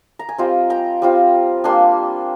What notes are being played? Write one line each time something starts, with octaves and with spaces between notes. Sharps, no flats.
A#5
G#5
G3 C4 F4 D#5 G5
G5 A#5
G3 C4 F4
G3 A#3 D4 G#5 C6